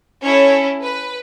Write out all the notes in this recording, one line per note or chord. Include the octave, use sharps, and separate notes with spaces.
C#4 E4 A4 C#5
B4